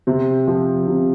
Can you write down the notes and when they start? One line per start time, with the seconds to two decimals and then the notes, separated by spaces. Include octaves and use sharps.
0.07 C3 C4
0.47 F3
0.87 C3